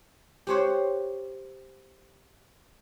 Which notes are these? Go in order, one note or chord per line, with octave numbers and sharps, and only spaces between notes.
G4 C5 C#5 F#5